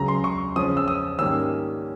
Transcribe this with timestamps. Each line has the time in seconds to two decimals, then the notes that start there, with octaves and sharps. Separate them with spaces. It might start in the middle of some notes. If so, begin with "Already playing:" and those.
Already playing: C#2 C#3 F#3 A#5
0.08 C6
0.24 C#6
0.56 C#3 F3 G#3 C#4 D#6
0.77 E6
0.88 D#6
1.19 G#2 D#3 G3 A#3 C#4 E6